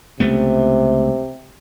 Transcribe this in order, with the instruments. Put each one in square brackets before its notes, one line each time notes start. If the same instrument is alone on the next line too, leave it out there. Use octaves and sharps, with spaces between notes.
[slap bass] C#2 A3 B3 [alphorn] C3